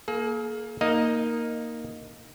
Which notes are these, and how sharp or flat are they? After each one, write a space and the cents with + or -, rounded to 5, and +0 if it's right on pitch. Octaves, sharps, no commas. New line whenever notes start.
A#3 +5 G#4 +45
A#3 +0 D#4 +0 D#5 +0